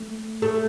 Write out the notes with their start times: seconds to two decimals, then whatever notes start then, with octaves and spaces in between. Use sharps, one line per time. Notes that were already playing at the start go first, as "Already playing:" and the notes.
Already playing: A3
0.42 A3